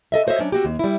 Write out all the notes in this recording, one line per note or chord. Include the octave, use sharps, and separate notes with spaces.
A4 D#5 E5
F#4 C5 C#5 D#5 E5
F#3 C#4 D4
C4 F#4 G4
D#2
G3 E4